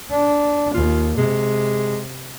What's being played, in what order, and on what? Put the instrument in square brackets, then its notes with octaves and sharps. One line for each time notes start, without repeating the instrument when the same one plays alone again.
[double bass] D4
[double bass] D#2 [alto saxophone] F4
[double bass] C3 [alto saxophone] G#3